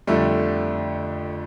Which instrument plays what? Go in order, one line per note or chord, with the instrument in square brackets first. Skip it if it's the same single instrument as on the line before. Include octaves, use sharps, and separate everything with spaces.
[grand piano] F2 D3 G3 [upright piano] A3